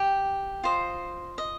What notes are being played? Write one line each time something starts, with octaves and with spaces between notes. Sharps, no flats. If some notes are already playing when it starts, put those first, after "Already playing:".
Already playing: G4 G5
F4 C5 D#5
D#5